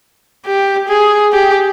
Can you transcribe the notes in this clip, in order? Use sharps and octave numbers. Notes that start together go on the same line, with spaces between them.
G4
G#4
G4